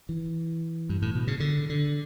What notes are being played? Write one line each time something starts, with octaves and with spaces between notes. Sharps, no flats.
E3
G2
A2
B2
C#3
D3
D3